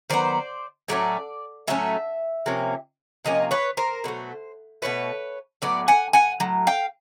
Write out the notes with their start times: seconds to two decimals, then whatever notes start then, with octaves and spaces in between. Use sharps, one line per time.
0.10 D#3 F#3 B3 C5 D5
0.88 A2 F#3 A3 C#4 D5
1.67 A2 F#3 A3 C#4 E5
2.46 C3 F3 A#3 C#4
3.25 C3 F3 A#3 C#4 D#5
3.51 B4 C#5
3.77 A#4 C5
4.04 B2 F#3 A3
4.82 B2 F#3 A3 B4 C#5
5.62 A2 F#3 B3 D5
5.88 F#5 G#5
6.13 F#5 G#5
6.40 A2 F#3
6.67 F5 G5